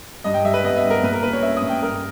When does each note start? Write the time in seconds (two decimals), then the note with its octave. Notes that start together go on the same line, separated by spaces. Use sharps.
0.24 G2 D#5
0.34 G5
0.44 G3 E5
0.54 B4
0.64 B3 D#5
0.77 E5
0.84 G2
0.90 A#4
1.03 A#2 B4
1.13 A#4
1.23 A#3 B4
1.33 C#5
1.42 C#4 E5
1.57 D#6
1.62 A#2
1.69 G5
1.83 G2 A#4